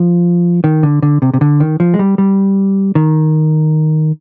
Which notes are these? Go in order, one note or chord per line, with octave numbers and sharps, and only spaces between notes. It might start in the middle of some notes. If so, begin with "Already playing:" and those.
Already playing: F3
D#3
D3
D3
C3
C3
D3
D#3
F3
G#3
G3
G3
D#3